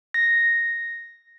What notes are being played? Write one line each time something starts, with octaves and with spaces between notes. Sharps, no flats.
A#6